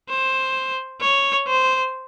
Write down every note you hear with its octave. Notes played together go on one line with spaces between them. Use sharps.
C5
C#5
C5